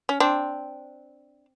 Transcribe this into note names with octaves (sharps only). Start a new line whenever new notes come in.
C#4
C4 D4